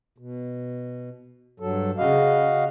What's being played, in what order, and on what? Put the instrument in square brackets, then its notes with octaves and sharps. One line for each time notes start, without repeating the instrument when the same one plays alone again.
[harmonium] B2
G2 F#3 A4
[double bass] C#3 [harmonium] F#4 D#5 F5